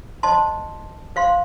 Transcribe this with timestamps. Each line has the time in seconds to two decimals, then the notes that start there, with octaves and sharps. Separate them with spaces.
0.23 C5 D#5 A5 C6
1.16 C5 F5 C6